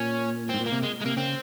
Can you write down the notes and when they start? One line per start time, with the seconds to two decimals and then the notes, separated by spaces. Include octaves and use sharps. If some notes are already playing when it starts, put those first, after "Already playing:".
Already playing: A#2 C#4
0.49 G#2 C4
0.60 A#2
0.66 A#3
0.72 C3
0.83 G#3
1.02 G#3
1.05 C3 A#3
1.16 C#3 C4